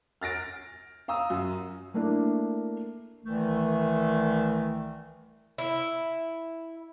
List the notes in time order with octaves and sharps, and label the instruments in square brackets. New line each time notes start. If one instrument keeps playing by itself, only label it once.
[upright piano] F6 A6 A#6 D7
F5 A#5 D#6 E6
F#2
[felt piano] A3 A#3 D4 E4
[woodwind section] C2 D#3 E3 A3
[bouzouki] E4